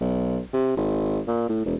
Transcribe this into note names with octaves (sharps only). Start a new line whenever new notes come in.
B1
C3
G#1
A#2
A2
E1